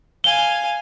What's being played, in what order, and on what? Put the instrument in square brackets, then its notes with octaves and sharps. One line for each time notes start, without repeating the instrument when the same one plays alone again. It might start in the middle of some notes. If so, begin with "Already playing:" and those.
[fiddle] F5 G#5 [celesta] G7